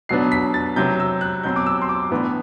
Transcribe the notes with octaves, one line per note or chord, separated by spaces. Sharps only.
B2 F#3 B3 D4 C7
B6
A6
C3 F#3 C4 G6
E6
F#6
B2 F#3 C4 G6
D6
E6
C6
D6
A2 E3 B3 D4